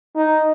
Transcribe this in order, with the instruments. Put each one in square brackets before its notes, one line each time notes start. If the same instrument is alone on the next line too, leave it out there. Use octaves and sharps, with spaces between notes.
[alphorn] D#4